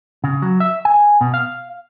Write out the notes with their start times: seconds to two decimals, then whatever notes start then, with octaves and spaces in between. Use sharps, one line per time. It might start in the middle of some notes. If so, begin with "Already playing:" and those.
0.24 C#3
0.42 F#3
0.60 E5
0.85 G#5
1.21 B2
1.34 F5